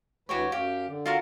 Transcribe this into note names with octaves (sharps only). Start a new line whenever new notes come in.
D2 E3 F#4 G4 B4 C#5
F#2 G4 F5
D3
F4 F#4 A#4